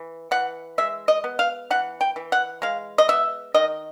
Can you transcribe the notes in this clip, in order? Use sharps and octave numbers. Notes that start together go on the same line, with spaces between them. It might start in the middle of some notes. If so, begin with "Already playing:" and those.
Already playing: E3
E3 F#5
G#3 E5
D#5
B3
F5
E3 F#5
G5
E3
F#5
G#3 F5
D#5
B3 E5
D#3 D#5